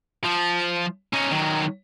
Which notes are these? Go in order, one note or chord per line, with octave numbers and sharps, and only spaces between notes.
F3
C#4 D#4
D#3 F#3